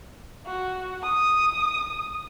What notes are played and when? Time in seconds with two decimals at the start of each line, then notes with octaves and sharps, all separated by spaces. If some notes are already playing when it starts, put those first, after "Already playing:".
0.47 F#4
1.03 D#6